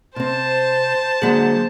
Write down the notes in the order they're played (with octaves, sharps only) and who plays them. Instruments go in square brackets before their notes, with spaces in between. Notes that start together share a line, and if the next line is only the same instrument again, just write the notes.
[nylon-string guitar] C3 C4 [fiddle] C5 A5
[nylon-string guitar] D3 F#3 G#3 [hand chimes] A#3 G#4